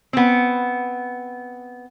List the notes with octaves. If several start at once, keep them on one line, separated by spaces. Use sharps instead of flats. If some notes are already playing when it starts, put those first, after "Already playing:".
B3 C4